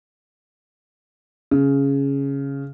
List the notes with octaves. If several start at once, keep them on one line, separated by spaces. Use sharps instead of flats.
C#3